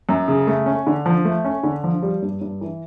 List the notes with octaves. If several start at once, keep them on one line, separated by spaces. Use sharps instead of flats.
F#2
C#3
A3
C#4
D3
F3
A3
C#4
D3
F3
G3
G2
G2
E3